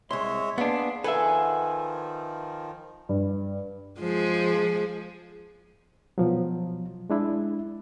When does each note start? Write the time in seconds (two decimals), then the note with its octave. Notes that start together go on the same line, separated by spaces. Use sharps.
0.11 C2 G#3 C#5 E5 C6
0.58 A#3 B3 D4 G#4 C6
1.04 D#3 F3 G#4 A4 B4 E5 F#5 G#5
3.09 G2
4.00 F3 G#3 G#4
6.18 B2 F3 F#3
7.10 G#3 D4 E4